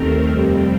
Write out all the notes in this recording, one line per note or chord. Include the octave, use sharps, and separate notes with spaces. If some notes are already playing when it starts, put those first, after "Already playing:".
Already playing: D#2 D#3 A3 C4 A#4
F2 C3 G3 C4